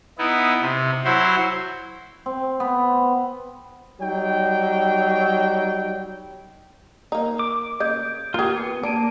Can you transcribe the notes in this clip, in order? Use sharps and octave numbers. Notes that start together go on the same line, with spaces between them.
B3 D#4 E4
C3
F#3 E4 F#4 C5
C4
B3
F#3 G3 D#4 G5
A#3 D#4
D6
C#3 A#3 D#5 G6 G#6
A#3 F4 G4 G#4
B3
A#3 D4 A5 D7 D#7